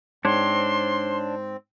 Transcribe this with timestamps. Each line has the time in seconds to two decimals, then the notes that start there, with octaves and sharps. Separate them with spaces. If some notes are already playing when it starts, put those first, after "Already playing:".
0.25 G#2 C4 D4 C#5 C6